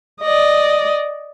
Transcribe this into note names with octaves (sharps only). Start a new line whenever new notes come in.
D5 D#5